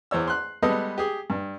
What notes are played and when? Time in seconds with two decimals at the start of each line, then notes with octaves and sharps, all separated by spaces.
0.11 E2 C5 C#5 E6
0.28 C6 F#6
0.62 G3 G#3 B3 A4 B4 D#5
0.98 G4 G#4
1.30 G2